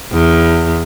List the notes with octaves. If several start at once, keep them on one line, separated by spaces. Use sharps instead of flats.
E2